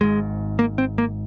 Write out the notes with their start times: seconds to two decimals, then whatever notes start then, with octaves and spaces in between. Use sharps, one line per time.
0.01 G#1 G#2 G#3
0.59 A#3
0.78 C4
0.98 A#3